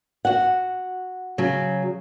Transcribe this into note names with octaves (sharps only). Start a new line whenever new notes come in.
F#4 F#5
C#3 F#3